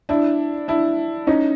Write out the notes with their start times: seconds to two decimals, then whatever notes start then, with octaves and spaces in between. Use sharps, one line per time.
0.09 D4 E4
0.68 D4 E4
1.27 C#4 D#4